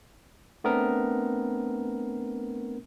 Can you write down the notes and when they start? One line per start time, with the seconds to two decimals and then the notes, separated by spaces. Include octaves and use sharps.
0.64 A3 B3 C4 D4 A#4